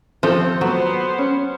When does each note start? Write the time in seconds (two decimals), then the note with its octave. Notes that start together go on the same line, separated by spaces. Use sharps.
0.23 F3 C4 G4 A4
0.61 F#3 B3 C5
1.18 C#4